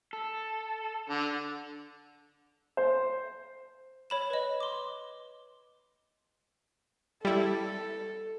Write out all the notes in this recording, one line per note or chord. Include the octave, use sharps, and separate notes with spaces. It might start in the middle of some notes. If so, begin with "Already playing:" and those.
A4
D3
C5
C#5 B5 E7
B4 D#5
C6 D6
G3 E4 A4